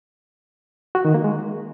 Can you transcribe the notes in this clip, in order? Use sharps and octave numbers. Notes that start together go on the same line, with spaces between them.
F#4
D#3
A#3
G#3